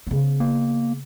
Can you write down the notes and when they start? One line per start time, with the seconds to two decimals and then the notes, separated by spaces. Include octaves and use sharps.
0.07 C#3 B3
0.40 A#3